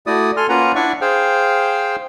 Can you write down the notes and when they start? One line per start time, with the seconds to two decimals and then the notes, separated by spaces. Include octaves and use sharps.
0.07 A3 E4 F#4 D5 D#6
0.37 A4 G#5 C6 F6
0.49 A#3 C#4 F4 B4 F#5 A#5
0.75 D4 E4 D5 E5 F#5 C#6
1.01 G#4 C5 F5 G5